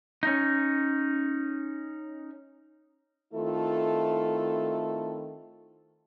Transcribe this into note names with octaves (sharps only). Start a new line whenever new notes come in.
C#4 D#4
D#3 A3 C4 E4 F4 A4